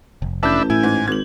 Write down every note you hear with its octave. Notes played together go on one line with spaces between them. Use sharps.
F1
A1 D4 B4 E5 A5 G6
A2 E4 G#5
G#2
G#1 G#6 F#7